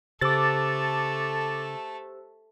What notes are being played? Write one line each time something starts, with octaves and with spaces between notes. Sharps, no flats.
C#3 A3 G4 A4 C5 D6 E6 A6